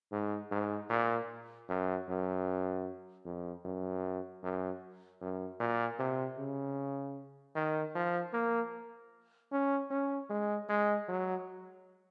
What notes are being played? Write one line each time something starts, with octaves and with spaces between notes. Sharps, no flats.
G#2
G#2
A#2
F#2
F#2
F2
F#2
F#2
F#2
A#2
C3
C#3
D#3
F3
A#3
C#4
C#4
G#3
G#3
F#3